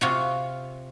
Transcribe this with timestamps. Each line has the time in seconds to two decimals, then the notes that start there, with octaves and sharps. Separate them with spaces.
0.01 C3 F4 F#4